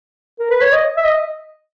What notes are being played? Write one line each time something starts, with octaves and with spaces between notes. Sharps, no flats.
A#4
B4
C#5
D#5
E5
D#5